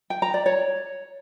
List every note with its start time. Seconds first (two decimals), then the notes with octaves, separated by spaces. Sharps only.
0.10 G5
0.22 A#5
0.34 D5
0.46 C#5